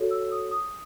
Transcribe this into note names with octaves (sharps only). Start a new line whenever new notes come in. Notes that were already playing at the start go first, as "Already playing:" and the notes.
Already playing: F#4 A4 C#5
E6
D#6
D#6